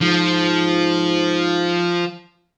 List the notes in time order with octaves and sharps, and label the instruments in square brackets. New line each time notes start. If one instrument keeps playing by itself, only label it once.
[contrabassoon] G#2 [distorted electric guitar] F3